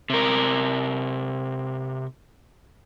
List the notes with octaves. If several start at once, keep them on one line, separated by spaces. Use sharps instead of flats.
C3 A#4